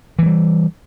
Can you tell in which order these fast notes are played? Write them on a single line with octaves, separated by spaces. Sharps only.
E3 G#3 G3